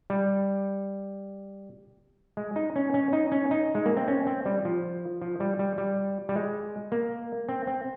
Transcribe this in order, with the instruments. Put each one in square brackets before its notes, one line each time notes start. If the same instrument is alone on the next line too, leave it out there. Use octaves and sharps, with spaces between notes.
[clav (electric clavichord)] G3
G#3
D#4
C#4
C#4
D#4
C#4
D#4
G#3
A#3
C4
C#4
C4
G3
F3
F3
G3
G3
G3
G3
G#3
A#3
C4
C4